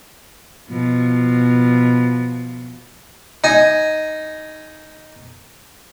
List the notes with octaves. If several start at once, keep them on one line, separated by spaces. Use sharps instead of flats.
B2 F3
D#4 G#5